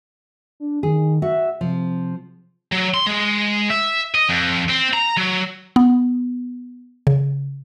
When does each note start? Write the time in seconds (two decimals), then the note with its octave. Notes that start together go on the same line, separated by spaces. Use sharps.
0.60 D4
0.83 D#3 G#4
1.22 F#4 E5
1.61 C3 F3
2.72 F#3
2.94 C6
3.06 G#3
3.70 E5
4.15 D#5
4.29 F2
4.69 C4
4.93 A#5
5.17 F#3
5.76 B3
7.07 C#3